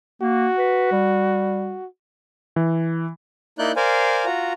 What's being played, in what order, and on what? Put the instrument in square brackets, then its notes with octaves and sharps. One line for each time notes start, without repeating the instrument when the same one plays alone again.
[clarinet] A#3 [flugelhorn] F#4
[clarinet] B4
G3
[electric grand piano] E3
[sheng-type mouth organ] A#3 D#4 E4 D5 F#6 G6
A#4 C5 D5 F5 G#5
F4 F#4 A#5